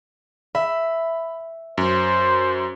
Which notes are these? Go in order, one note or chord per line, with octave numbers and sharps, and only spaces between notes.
E5 B5
F#2 C5